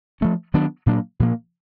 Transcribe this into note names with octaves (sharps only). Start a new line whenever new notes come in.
F3 A3 C#4
D#3 F#3 B3 D4
A#2 F#3 A#3 D4
A#2 F3 A#3